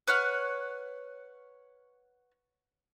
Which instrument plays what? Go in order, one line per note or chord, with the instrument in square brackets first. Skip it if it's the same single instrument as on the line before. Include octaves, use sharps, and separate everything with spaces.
[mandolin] B4 C#5 F#5 F6